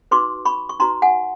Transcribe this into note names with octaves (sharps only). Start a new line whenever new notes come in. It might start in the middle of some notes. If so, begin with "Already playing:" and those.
D#4 F#4 B4 C6 D6
B5 C#6
C#6
D#4 F#4 B4 A#5 C6
F#5 G#5